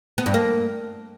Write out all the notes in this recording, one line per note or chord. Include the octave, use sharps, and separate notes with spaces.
B3
G2
A#3